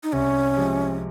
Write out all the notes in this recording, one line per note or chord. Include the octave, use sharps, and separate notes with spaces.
D#4
C2 C#4
C3 F3 G#3